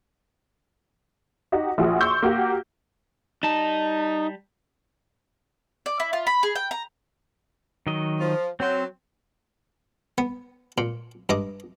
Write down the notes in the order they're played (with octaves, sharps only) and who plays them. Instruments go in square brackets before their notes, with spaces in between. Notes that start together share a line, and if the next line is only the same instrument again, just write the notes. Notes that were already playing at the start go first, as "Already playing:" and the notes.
[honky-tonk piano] D#4 F#4 G4
A#1 F3 F#4 G#4
C6 C#6 E6 G6
A#3 F#4 G4
[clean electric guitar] G3 A5 [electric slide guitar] D#4
[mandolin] D5
E4
F4
B5
G#4
G5
A#5
[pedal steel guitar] D#3 F#3 D#5
[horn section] F3
[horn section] F#3 [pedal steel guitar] C4 C5
[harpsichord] B3
A#2
G2 D#5 D6